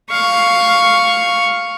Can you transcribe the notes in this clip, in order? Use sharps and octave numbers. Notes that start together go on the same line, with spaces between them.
F5 C#6